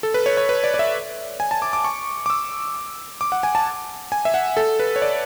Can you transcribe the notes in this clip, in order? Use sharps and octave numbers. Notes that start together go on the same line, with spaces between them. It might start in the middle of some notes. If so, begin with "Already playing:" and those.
A4
B4
C#5
C#5
B4
D5
D5
E5
G#5
A5
D6
D6
C#6
D6
E6
D6
F#5
G#5
A5
G#5
E5
F#5
A4
B4
C#5
D5